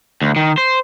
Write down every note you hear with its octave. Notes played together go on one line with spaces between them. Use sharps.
D2
D#3
C5